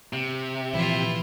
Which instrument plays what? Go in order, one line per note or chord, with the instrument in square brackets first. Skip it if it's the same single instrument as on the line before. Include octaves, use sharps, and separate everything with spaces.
[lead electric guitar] C3
[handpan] A#2 E3 F3 [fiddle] E4 F4